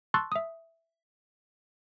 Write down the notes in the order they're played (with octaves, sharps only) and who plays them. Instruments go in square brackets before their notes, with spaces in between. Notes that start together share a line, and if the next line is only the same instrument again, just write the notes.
[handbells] A5 C6 C#6 E6 F#6 A6
E5 D#6